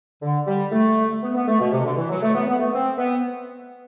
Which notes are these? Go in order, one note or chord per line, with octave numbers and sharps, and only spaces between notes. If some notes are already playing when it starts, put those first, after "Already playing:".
D3
G3
A3
B3
B3
A3
B2
C3
D3
E3
F#3
A3
B3
B3
A3
C4
B3